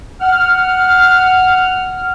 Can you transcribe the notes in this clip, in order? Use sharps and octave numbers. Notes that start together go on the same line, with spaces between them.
F#5 F6